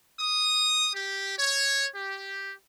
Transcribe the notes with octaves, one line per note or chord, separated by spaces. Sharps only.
D#6
G4
C#5
G4